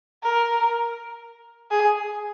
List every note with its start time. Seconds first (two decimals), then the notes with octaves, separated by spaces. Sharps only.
0.23 A#4
1.71 G#4